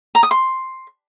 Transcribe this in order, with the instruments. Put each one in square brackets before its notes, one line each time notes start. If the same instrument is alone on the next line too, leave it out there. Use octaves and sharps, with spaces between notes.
[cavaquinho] A#5
D#6
C6